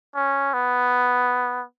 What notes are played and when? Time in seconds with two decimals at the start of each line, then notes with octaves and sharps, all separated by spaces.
0.15 C#4
0.53 B3